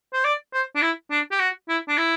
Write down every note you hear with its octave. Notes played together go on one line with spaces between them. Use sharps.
C5
D5
C5
D4
E4
D4
G4
F#4
E4
D4
E4